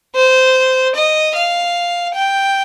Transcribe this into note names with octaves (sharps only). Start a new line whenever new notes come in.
C5
D#5
F5
G5